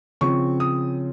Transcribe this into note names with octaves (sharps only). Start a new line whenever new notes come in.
C#3 F3 C4 C#6
D#6